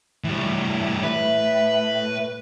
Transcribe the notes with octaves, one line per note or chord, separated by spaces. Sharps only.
A2 E3 G3
B4 E5